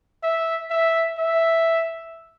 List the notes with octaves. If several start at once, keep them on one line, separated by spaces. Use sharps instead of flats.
E5
E5
E5